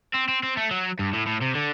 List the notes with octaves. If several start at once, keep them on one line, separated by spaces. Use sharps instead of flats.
C4
C4
C4
A3
F#3
G2
A2
A2
C3
D3